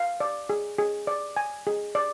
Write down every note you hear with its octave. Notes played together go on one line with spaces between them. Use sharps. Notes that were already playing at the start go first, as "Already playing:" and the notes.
Already playing: F5
D5
G#4
G#4
D5
G#5
G#4
D5